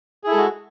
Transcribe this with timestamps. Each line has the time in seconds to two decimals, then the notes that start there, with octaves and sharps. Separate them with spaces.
0.24 G#4
0.27 E4
0.31 A4
0.34 G#3
0.38 F#4